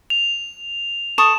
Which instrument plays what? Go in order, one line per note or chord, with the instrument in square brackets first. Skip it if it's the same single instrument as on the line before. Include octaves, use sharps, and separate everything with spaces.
[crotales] F7
[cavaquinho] A4 C#6 D#6 [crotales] E7